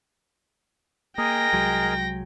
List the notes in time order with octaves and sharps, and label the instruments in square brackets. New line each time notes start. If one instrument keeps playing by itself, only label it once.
[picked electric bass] A#3 [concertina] G#4 A#4 D#5 [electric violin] G5 A#6
[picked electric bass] C2 F#3 G#3